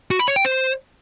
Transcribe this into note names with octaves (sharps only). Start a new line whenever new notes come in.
F#4
B5
C#5
G5
C5